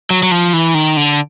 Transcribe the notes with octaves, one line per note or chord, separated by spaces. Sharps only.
F#3
F#3
F3
E3
D#3
D3